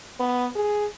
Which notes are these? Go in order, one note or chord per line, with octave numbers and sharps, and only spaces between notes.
B3
G#4